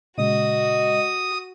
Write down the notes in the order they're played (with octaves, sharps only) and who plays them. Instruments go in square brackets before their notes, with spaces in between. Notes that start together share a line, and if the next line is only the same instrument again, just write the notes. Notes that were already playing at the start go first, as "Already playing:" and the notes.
[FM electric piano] A#2 C#3 G#3 [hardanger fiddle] F#4 [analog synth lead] D#5 [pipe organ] D#6